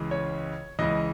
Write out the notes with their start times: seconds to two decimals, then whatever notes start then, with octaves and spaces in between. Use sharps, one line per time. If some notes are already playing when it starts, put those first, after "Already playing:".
Already playing: C#2 C#3 E3
0.11 C#5
0.79 C#2 C#3 E3 D#5